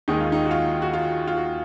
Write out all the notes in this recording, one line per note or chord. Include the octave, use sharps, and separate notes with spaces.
D#2 D#3 G#3 D#4
F4
D#4
F#4
F4
F#4
F4
F4
F#4